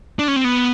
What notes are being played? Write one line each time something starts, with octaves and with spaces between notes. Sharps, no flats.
D4
C#4
C4
B3